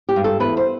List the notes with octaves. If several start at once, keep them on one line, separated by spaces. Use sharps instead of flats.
G4
G2
A4
E2 B4
C5